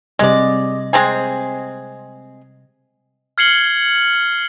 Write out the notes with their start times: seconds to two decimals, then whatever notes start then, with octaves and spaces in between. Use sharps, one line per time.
0.19 C3 G3 G#3 D5 D#5
0.93 G#3 C4 G#4
3.38 F6 G#6 C7 C#7 F#7 G7